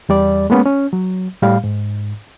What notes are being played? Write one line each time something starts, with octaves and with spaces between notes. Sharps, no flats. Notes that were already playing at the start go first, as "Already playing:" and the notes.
E2 G3 D5
G#3 A#3 B3 C#4
C#4
F#3
A2 G3 F5
G#2